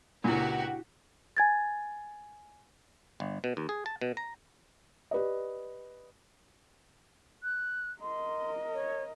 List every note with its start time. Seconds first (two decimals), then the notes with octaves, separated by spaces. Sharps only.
0.24 C#2 A#2 D4 E4 F#4 G4
1.37 G#5 G#6 A6
3.20 G1
3.44 B2
3.57 D#2
3.69 G#4
3.86 A5
4.01 B2
4.17 A#5
5.11 G4 B4 D5 D#5
7.43 F#6
8.02 A#4 D#5 C6
8.74 C#5